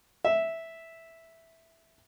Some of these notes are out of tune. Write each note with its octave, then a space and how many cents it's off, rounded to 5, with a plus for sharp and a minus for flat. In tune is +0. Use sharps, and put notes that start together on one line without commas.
E5 -5